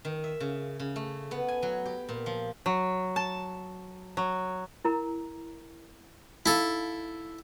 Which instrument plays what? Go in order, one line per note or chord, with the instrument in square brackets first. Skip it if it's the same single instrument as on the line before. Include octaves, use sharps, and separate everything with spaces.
[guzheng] D#3
E5
C#3
C#3
A3
B3
G#5
F#3
G4
A#2
F3
[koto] F#3
A5
F#3
[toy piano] E4 A#4 A#5
[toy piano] D#4 F5 [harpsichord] E4 A4